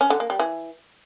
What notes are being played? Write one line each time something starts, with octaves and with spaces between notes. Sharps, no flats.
C#4
D3
A#3
G3
E3